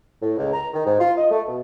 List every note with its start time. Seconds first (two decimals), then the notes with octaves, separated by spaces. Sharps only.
0.22 A2
0.38 C#2
0.54 A#5
0.74 D#3
0.86 G#2
1.00 F4
1.17 D#5
1.31 A3
1.48 B2